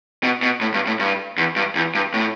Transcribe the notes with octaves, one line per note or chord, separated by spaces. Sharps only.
B2
B2
A2
G2
A2
G2
E2
G2
E2
G2
A2